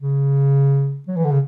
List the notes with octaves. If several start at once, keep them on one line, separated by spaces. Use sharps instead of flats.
C#3
F#3
E3
D3
C#3